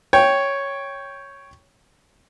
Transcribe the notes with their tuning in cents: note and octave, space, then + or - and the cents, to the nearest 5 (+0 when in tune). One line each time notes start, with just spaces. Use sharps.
C#5 +0 G5 +0